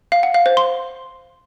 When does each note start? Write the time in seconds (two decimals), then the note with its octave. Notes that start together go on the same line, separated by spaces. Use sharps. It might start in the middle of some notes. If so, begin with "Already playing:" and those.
0.12 F5
0.23 F#5
0.34 F5
0.46 C5
0.57 C6